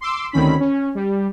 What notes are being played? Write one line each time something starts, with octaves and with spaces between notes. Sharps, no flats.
C6 D6 E6
D2 D#3 C4 C#4 B5 B6
C#4
G3